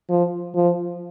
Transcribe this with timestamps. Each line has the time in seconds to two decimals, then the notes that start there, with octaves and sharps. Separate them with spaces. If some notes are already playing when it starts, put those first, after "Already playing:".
0.09 F3
0.55 F3